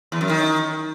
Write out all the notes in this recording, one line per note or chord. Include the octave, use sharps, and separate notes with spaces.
E2
F#2
D#3